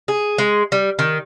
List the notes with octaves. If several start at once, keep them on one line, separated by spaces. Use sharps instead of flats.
G#4
G#3
G3
D#3